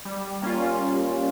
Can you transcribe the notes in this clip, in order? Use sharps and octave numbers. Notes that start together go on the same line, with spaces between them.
G3
A#3 C#4 F4